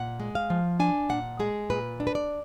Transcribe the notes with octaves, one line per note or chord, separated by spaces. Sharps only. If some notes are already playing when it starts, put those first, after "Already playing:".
Already playing: A#2 F#5
G#3
F5
F3
D4 G#5
A#2 F#5
G#3 G#4
A#2 B4
D4
B4
D5